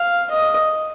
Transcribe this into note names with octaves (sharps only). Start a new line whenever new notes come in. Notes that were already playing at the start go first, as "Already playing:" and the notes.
Already playing: F5
D#5